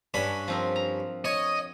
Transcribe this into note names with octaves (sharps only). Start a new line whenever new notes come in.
G2 C#4 D4 B5
F3 C4 A#4
A#5
C#5 D#5